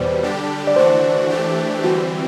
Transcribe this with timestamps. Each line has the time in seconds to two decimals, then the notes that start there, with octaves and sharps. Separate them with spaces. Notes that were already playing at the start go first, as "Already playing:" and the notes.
Already playing: E2 B2 G3 B4 C5 D5
0.23 D3 G3 D4 G4
0.67 D5
0.76 E3 A3 D4 F#4 C5
1.30 E3 A3 D4 G4
1.84 E3 G3 C4 F#4